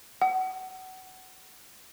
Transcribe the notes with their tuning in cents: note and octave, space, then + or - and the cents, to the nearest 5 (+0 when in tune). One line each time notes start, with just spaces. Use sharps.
F#5 +20